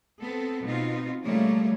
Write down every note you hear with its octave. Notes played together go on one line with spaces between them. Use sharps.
B3 C4 A4
B2 B3 C4 D#4 F4
C#3 F3 G3 A3 A#3 C#5